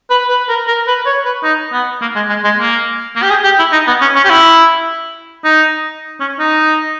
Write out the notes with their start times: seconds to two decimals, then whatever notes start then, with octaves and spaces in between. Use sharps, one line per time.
0.11 B4
0.30 B4
0.49 A#4
0.68 A#4
0.87 B4
1.06 C#5
1.25 B4
1.44 D#4
1.73 B3
2.01 A#3
2.15 G#3
2.29 G#3
2.44 G#3
2.59 A#3
3.16 A#3
3.23 G4
3.30 G#4
3.44 G4
3.59 E4
3.73 D#4
3.87 B3
4.01 C#4
4.16 C#4
4.25 G4
4.30 E4
5.45 D#4
6.20 C#4
6.40 D#4